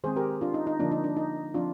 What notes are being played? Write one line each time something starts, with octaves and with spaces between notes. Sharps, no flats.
D#3 G#3 C4 G#4 C5
G4 A#4
D4 F4
D#4
D#4
D3 F3 A#3 D4 F4
D#4
D4
D#4
F3 C4 D4 F4